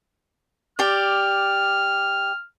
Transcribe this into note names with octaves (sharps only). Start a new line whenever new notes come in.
G4 D5 F6